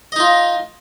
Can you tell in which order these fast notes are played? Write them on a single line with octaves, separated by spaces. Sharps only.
D#5 D#4 F4